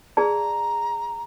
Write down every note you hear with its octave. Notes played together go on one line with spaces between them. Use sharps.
G#4 D5 A5 A#5